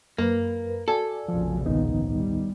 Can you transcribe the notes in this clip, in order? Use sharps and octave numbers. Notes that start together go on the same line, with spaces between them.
F#2 A#3 A#4 B4
F#4 A4 D5 G#5
F1 A#1 C#3 F3
D2 G#2 D#3 B3 D#4
G3